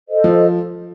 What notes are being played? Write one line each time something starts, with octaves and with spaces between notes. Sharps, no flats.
A4 C5 D#5
F3